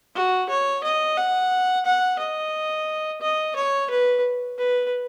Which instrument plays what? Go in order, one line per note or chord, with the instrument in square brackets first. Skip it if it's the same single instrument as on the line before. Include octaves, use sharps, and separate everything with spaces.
[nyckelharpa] F#4
C#5
D#5
F#5
F#5
D#5
D#5
C#5
B4
B4